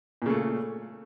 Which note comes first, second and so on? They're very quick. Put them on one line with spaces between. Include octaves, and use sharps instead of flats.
A#2 C#3 A3